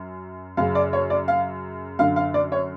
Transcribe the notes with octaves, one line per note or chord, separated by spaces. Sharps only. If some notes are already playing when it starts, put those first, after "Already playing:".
Already playing: F#2
F#2 C#3 F5
D5
C#5
D5
F5
F#2 D3 F5
F5
D5
C#5